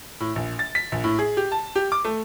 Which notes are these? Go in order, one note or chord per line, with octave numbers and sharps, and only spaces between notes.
A2
A#1
A6
B6
A#1
A2
G#4
G4
A5
G4
D6
A3